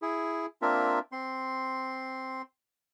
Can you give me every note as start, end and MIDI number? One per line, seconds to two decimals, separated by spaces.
0.02 0.46 64
0.02 0.46 68
0.62 0.99 58
0.62 0.99 60
0.62 0.99 62
0.62 0.99 65
0.62 0.99 70
0.62 0.99 76
1.12 2.42 60
1.12 2.42 84